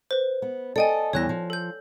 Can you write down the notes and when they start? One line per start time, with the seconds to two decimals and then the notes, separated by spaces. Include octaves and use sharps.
0.11 B4 C5
0.42 B3
0.76 A4 D5 D#5 G5 G#5
1.13 E2 E3 G3 C#5 F#6 A#6
1.29 F3
1.50 A4 G6